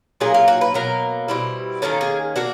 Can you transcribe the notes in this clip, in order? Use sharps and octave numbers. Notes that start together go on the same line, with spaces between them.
A#2 F#3 A#3 D#4 G#4
F4
F#4
B4
B2 F#3 A#3 A#4
B2 G3 C4 E4
D#3 G3 A#3 C#4 A4
G#4
A#3 D4 F#4